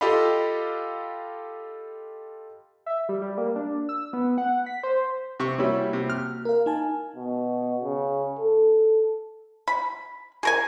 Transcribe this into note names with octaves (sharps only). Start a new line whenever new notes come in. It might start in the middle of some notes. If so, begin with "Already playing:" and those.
F4 G4 A4 D#5 F5 B5
E5
G3
G3
A#3
D4
E6
B3
F#5
B6
C5
C3 C#6
G3 A#3 C#4 E4 F#4
C3
F6
A#4 F5
D#4 G#5 A5
B2
C#3
A4
B5
G#4 A#4 G#5